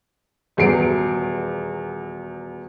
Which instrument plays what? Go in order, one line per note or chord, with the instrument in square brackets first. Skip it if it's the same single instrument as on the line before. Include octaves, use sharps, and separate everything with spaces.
[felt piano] D#1 E2 F#3 C7 D7